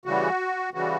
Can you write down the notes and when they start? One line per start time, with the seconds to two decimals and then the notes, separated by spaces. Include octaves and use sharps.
0.05 C#3 E3 G3 F#4
0.73 C#3 E3 G3 F#4